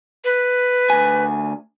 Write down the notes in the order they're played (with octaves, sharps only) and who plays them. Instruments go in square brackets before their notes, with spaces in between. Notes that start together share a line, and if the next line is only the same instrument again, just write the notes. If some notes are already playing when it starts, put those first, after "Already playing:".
[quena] B4
[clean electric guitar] D2 G#5